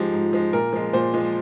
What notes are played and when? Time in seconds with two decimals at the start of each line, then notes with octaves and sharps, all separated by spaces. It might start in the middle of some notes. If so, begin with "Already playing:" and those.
Already playing: G#2 F3 G#3 G4
0.13 G#2
0.33 F3 G#3
0.53 A#2 A#4
0.73 F3 G#3
0.93 A#2 C5
1.14 F3 G#3